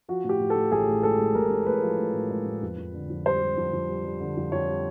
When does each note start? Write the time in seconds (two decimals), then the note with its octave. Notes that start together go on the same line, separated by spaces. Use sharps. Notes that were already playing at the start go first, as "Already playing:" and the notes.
0.09 F3 F#4
0.24 A2
0.29 G4
0.39 A2
0.50 A4
0.56 A2
0.72 A1 G#4
0.88 A2
1.03 G#3 A4
1.19 G#3
1.35 A1 A#4
1.51 A2
1.66 A1 B4
1.83 F3
1.99 A2
2.14 A2
2.31 G#3
2.46 A2
2.62 F2
2.78 F2
2.94 D3
3.10 F2
3.26 G3 C5
3.41 G3
3.57 F2
3.73 F2
3.88 G3
4.05 G3
4.20 D3
4.37 F2
4.52 F2 C#5
4.68 G3